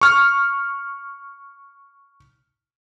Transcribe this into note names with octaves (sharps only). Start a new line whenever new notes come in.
C#6 F6